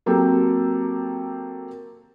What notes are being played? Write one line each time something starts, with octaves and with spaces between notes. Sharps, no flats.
F#3 A#3 C4 G4 A4